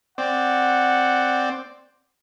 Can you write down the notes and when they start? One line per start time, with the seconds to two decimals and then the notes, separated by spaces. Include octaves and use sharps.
0.18 C4 D5 F#5